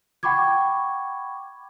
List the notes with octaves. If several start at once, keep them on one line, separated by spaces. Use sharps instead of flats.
F#5 G5 B5 C#6 D6 G#6